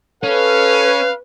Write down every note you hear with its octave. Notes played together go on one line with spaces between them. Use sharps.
C#4 A4 B4 F5